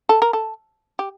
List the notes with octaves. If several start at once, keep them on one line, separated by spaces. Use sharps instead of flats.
A4
A#4
A4
G4